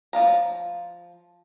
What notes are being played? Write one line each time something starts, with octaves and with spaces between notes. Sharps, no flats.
F3 D4 F5 A#5